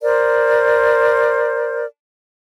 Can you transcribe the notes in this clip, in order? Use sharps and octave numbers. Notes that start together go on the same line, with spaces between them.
A#4 C5 D5